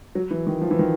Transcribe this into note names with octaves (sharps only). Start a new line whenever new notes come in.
F#3
E3
D#3
F3
E3
D#3